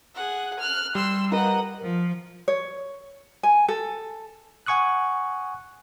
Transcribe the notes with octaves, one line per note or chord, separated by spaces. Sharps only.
G#4 F#5
F6 F#6
G3 C6 E6
A#4 B4 D#5 F#5
F3
C#5
G#5
A4
F#5 G#5 C#6 D#6 F#6